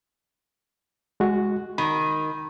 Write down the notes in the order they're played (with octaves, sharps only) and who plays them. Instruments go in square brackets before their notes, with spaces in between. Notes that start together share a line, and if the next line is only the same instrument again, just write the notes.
[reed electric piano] G#3 F#4
[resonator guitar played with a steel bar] D#3 [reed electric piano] B5